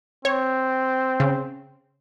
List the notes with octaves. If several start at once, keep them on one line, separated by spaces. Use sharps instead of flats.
C4 C#5
C#3